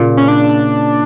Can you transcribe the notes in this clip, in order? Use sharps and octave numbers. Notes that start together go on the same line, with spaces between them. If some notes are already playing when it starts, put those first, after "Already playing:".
Already playing: A#2 C#3
C#4
D4